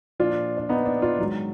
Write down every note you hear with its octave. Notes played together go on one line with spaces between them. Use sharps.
A#2 F3 D4 F4
D4
B3 D#4
D4
D4 F4
G#2 D#3 F#3